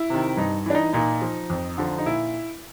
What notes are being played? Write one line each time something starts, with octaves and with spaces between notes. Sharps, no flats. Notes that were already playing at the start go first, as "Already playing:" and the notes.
Already playing: E4
C3 D#3
G2 D#4
E3 D4
D#4
A#2 D#4
F3
F2
D3 F3
D#4
A#2 E4